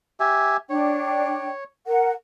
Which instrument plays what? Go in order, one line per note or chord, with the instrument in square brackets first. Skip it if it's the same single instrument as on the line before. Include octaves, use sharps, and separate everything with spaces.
[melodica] G4 E5 G#5
[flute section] D4 G5 [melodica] C#5
[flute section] A#4 F#5